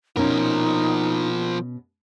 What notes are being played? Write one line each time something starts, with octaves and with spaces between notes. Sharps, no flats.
B2 F3 C#4 D#4 A#4